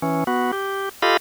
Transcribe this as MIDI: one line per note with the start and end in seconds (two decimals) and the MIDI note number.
0.02 0.24 52
0.02 0.24 61
0.27 0.51 59
0.27 0.51 66
0.53 0.89 67
1.02 1.17 65
1.02 1.17 67
1.02 1.17 69
1.02 1.17 75
1.02 1.17 77
1.02 1.17 83